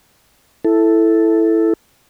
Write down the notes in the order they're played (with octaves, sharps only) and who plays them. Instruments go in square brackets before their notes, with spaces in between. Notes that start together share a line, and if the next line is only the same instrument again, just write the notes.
[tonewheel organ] E4 A4